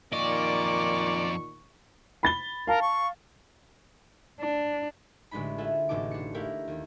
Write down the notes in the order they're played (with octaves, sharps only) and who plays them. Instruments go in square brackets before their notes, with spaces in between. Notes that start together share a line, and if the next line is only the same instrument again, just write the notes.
[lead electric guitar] F2 D#5 [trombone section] A#2 D#3 [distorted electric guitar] D5 [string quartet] C#6
[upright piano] B5 A6 G7
[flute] A#4 [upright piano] F5 A5
[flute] C#6
[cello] D4
[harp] A1 D3 G#3 D4 D#4 B5
F4 G#4 A4 E5 F#5
E1 A1 C3 D#4 A5 D6
D4 C#7
A3 E4 G4 A#4 F5
D#2